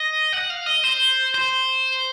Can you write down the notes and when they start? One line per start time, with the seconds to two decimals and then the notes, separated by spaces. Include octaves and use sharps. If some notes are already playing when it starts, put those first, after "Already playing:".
Already playing: D#5
0.33 F#5
0.50 F5
0.66 D#5
0.84 C5
1.35 C5